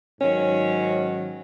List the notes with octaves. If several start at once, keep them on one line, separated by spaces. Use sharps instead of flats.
G#2 D#3 F#3 C#4